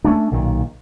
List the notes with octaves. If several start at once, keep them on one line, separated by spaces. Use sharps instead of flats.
A3 C#4 D4
B1 A#2 D#3